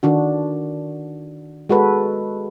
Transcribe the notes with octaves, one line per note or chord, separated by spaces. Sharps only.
D#3 D4 F#4
G#3 F#4 A4 B4